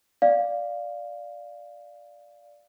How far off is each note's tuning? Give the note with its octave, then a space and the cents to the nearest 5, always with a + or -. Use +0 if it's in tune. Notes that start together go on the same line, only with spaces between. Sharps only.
D5 +0 F5 +0